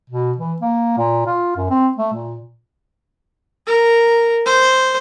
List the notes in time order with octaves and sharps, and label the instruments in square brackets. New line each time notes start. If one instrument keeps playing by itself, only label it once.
[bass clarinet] B2
E3
A#3
A#2
F4
F#2
C4
A3
A#2
[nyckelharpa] A#4
C5